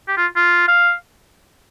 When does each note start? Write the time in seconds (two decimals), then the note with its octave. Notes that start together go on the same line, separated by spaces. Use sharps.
0.08 G4
0.17 F4
0.36 F4
0.68 F5